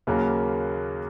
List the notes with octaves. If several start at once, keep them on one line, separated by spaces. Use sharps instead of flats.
D#2 C#3 F#3 A#3